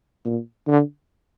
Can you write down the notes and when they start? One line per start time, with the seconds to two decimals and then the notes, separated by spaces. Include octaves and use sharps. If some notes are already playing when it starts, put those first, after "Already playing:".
0.26 A#2
0.68 D3